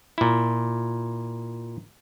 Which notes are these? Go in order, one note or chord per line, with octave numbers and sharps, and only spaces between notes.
A#2 E4